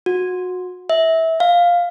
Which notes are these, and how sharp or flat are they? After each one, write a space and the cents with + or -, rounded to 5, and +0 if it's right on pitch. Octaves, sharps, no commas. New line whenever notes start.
F#4 -25
E5 -20
F5 +5